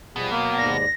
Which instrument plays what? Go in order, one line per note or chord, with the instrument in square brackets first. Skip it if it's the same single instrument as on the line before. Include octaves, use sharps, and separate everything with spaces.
[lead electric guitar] B2 [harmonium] F3 G3 G#4
[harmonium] F#3 [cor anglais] A#3
[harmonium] D#2 G#2 D5 [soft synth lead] A#6